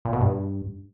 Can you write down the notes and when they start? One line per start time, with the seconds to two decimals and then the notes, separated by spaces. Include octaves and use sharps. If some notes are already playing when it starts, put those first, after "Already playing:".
0.05 A#2
0.13 B2
0.21 G2